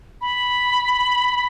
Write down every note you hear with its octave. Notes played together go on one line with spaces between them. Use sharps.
B5